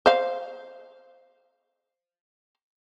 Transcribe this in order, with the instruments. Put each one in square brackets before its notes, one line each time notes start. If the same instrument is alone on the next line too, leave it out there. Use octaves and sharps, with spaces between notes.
[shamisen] C5 F5